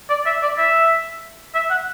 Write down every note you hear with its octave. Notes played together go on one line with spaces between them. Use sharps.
D5
E5
D5
E5
E5
F#5